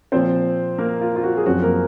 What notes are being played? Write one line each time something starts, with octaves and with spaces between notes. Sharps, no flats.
A#2 F3 C4 C5
A#3 A#4
F4
F4
F#4
G#4
F#2 F3 C4 F#4
A#3 A#4